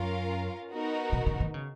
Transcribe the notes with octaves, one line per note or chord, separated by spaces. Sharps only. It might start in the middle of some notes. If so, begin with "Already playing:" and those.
Already playing: F#2 C#4 F4 A#4 F5
B3 D#4 F#4 A#4
B2
C#3
D#3
C#3